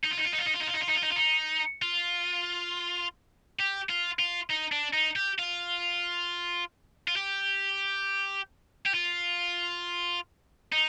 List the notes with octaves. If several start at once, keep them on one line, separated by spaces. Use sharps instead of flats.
D#4
F4
D#4
F4
D#4
F4
D#4
F4
D#4
F4
D#4
F4
D#4
F4
D#4
F4
D#4
F4
G4
F4
F4
D#4
D4
D#4
G4
F4
F4
G4
G4
F4
D#4